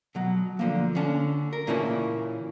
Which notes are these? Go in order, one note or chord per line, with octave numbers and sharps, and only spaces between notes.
B2 F#3
D3 F3 A#3
D3 C#4 A5
A#4
A#2 C#3 E3 A#3 C#4 A5